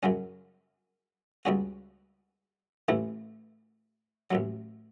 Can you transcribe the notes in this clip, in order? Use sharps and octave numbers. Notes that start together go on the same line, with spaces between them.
F#2 C#3 F#3 C#4
C#2 C#3 G3 C#4 F#4
A1 A2 E3 A3 E4
A1 A2 F#3